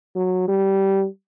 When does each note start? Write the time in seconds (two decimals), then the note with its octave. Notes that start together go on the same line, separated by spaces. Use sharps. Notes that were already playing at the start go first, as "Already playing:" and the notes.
0.15 F#3
0.48 G3